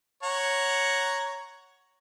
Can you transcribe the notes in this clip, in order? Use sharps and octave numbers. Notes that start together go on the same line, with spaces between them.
C#5 F#5 A#5